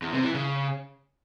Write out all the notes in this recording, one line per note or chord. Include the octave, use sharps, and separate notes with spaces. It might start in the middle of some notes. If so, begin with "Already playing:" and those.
E2
C3
E3
C#3